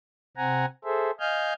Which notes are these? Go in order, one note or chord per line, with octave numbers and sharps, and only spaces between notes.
C3 C4 F#5 G#5 A#5
G#4 A4 C5 E5
D#5 F5 G#5 F6 G6